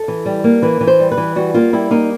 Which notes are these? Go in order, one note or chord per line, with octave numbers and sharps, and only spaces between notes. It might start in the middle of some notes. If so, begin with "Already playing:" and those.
Already playing: A4
E3
G3
A#3
E3 B4
E3
C5
G3
B4
E3
G3 F#4
A#3 F4
G3 E4
A#3 D#4